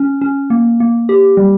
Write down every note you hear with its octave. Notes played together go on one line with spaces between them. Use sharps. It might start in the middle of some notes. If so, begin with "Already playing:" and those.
Already playing: C#4
C#4
A#3
A#3
G4
G3